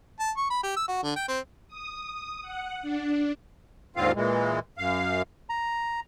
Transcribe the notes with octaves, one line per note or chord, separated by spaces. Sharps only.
A5
C#6
B5
G4
E6
F#4
D3
G5
C4
D#6
F#5
D4
D#2 G#2 D3 C4 F4 F5
A#2 E3 G#3
F#2 F5
A#5